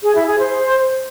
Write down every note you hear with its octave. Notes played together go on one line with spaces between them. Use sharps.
G#4
E4
G#4
C5